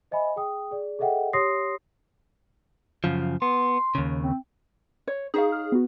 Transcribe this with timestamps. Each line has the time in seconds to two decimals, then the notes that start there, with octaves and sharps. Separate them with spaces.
0.11 C5 D#5 E5 G#5 B5
0.36 G#4 G5 D#6
0.71 G#4 D5
0.99 G#4 A4 D#5 E5 F#5 G5
1.33 G4 C#5 C6 D#6 A#6 C7
3.04 F#2 C#3 F3
3.42 B3 C6
3.95 D#2 C#3
4.23 C4
5.07 C#5
5.34 D#4 G#4 C#5 F5
5.52 F6
5.72 B3 F#4